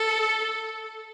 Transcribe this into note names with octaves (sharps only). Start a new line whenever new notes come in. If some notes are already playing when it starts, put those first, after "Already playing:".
Already playing: A4